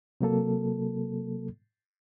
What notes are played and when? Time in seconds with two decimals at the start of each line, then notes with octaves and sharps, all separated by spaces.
0.21 C3 F#3 A#3 A4